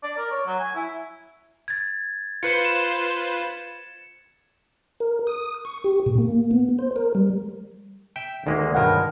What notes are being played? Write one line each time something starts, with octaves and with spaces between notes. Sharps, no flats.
D5
A#4
C#5
F#3
G#5
E4
G#6 A6
F4 B4 C5 C#7
E7
A#4
D#6
C#6
G4
A#2
A#3
B3
C5
A#4
G3
E5 G5
D2 D#3 G#3 A#3
B1 G2 G#3 A#4 F#5